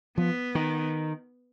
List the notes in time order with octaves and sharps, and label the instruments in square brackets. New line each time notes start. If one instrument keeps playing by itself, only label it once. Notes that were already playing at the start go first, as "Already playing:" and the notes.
[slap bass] F3 [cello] B3
[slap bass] D#3